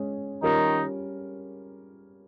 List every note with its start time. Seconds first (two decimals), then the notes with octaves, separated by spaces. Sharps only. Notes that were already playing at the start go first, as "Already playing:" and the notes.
Already playing: G#3 C#4 G#4
0.42 D#3 G3 C#4 D#4 F4 A#4